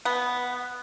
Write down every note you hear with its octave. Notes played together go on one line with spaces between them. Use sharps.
B3